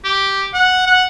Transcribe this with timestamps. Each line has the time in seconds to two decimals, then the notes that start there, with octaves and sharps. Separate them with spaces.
0.05 G4
0.54 F#5
0.86 F#5